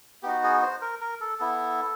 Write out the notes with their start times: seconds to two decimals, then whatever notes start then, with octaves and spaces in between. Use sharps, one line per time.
0.23 B3 D#4 F#4 G4
0.43 G#4
0.62 C5
0.81 A#4
1.01 A#4
1.21 A4
1.39 B3 E4 A4